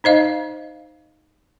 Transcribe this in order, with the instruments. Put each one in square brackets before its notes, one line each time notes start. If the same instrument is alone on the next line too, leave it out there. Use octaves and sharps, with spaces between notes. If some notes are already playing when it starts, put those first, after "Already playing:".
[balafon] D#4 C5 D#5 F5